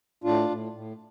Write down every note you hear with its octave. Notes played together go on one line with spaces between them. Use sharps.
A2 D4 F4
A2
A2